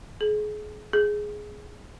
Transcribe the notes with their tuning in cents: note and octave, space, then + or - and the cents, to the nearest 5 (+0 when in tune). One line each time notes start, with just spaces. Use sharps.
G#4 +30
G#4 +5